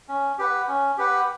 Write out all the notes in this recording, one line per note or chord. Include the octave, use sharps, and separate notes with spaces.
C#4
G4 B4 F#5
C#4
G4 B4 F#5